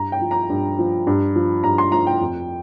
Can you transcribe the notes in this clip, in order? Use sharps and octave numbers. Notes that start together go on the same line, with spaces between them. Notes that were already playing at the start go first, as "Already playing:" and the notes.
Already playing: G2 A#5
G5
F3
A#5
G2
F3
G2
F3
G2 A#5
C6
F3 A#5
G5
F2